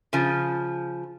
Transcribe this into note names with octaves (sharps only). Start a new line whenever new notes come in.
C#3 F3